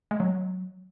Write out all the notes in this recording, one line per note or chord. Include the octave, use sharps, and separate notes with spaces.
G#3
F#3